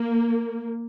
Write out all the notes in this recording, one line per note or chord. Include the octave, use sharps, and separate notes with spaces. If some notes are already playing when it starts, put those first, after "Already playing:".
Already playing: A#3